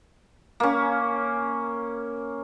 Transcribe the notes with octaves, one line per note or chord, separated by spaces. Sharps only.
A#3 C#4